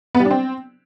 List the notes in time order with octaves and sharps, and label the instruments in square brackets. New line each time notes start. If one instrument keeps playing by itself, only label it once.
[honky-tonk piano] B3
G3
D4
C4